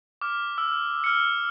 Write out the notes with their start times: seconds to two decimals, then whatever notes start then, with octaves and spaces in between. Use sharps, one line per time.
0.21 D6 F6
0.58 E6
1.04 F6 C#7